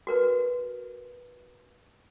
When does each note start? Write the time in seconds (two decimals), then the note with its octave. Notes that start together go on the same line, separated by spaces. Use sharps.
0.07 F#4 A#4 B4